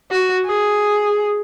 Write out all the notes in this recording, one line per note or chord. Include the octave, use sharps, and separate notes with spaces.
F#4
G#4